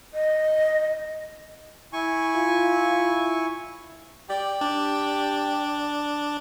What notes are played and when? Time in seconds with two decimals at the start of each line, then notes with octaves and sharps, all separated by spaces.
0.14 D#5
1.93 E4 G#5 C#6
2.36 F4
4.30 G4 D5
4.61 D4